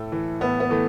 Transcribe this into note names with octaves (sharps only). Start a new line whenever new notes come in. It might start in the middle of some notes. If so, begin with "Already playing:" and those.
Already playing: A2 A4
E3
A2 B3
B3
E3 A3